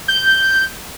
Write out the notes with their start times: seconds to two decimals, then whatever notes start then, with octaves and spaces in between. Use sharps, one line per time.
0.08 G6